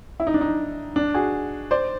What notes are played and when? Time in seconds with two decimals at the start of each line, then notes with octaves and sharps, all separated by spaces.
0.20 E4
0.27 D#4
0.34 D4
0.41 D#4
0.96 D4
1.14 F#4 G#4
1.71 C5 D5